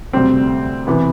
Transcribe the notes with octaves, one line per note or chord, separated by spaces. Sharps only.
D2 C3 G3 C4
C3 E3 B3 E4